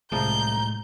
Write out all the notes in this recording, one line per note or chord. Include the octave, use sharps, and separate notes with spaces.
C2 A2 F3 G#3 A5 A#5 G6